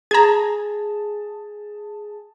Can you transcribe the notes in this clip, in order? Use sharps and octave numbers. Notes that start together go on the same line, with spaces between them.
G#4 A5 A#5 G#6